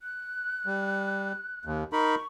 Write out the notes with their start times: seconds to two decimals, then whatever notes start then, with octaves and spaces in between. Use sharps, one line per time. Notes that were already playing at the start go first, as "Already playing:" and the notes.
0.02 F#6
0.66 G3
1.65 D#2
1.93 D#4 A#4 B5 C#6